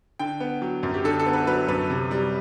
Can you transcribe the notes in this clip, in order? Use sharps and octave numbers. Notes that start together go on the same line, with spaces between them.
D3 G5
B3
F#3
F#2
G4
D3 A4
A4
B3
B4
F#3 B4
F#2 B4
C3
G3